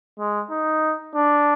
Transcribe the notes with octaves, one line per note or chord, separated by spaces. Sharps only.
G#3
D#4
D4